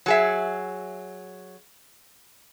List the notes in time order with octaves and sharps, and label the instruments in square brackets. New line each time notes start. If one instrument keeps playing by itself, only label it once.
[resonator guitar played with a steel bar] F#3 G#4 E5